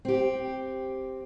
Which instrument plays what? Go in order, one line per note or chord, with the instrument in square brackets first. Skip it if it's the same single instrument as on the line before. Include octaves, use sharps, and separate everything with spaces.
[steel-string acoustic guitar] C4 G4